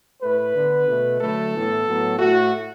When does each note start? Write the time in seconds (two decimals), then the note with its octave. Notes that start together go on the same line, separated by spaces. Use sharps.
0.22 A2 A3 B4
0.54 D3 B3
0.87 B2 A3
1.20 D3 F#3 A3 A4
1.53 A2 E3 B3
1.86 A2 F#3 B3
2.19 A2 A3 F#4